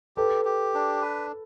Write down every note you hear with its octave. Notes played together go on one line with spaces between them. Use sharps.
G4 A4 B4
G4
D4
B4